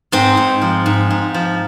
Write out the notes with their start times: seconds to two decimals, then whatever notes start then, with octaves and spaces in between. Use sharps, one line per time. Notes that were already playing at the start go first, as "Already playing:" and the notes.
0.12 G#2 C4
0.37 G#2
0.62 F3
0.86 G#2
1.10 G#2
1.34 F3